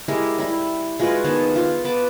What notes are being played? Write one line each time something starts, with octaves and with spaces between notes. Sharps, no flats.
G#3 E4 G4 A#4
G3 E4
G#3 F4 F#4 B4
D#3 B3 G#4 A5
F4
B3 B4 A5 D6